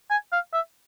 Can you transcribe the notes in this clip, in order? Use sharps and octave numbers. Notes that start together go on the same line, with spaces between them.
G#5
F5
E5